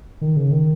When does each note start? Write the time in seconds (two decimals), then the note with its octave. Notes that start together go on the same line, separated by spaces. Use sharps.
0.21 D#3
0.36 C#3
0.51 D#3